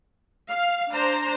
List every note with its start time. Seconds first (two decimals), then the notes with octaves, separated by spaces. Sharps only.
0.49 F5
0.93 D4 C5 A#5